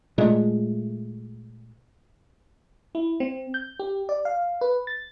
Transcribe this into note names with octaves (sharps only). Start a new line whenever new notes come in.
A#2 G#3 A3
E4
C4
G6
G4
D5
F5
B4
A6